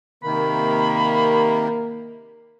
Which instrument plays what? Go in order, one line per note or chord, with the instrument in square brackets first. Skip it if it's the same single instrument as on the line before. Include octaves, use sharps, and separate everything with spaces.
[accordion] C3 D#3 [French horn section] A#3 A#4 [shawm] B5